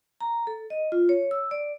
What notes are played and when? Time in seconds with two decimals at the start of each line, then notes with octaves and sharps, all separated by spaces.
0.21 A#5
0.47 A4
0.70 D#5
0.92 F4
1.09 C#5
1.31 E6
1.51 D5